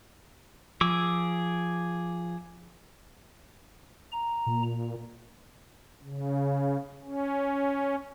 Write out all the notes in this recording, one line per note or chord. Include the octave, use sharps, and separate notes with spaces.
F3 G#4 D6 E6
A#5
A#2
C#3
C#4